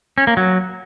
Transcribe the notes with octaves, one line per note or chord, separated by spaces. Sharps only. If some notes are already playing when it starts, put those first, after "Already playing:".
C#4
A#3
F#3